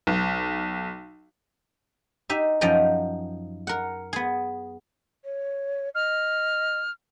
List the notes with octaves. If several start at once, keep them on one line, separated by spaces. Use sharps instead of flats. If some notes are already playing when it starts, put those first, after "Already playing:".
B1
D#4 G4 E5
F#2 F3 D#4 D#5 G5 A#5
A#4 F#5
B3 G#4
C#5
D#5 F6